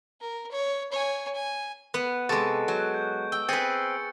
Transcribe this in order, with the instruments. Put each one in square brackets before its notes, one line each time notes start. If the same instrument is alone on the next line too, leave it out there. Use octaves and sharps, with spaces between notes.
[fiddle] A#4
C#5
C#5 G#5
G#5
[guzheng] B3 [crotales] F#6 D#7
[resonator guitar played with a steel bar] C3 [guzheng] G#3 A4 [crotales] C#6 D7
[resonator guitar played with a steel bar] F#3
[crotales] G6
[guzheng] G5 [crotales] E6
[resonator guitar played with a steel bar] C4 [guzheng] G#4 B4 [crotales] A6 C#7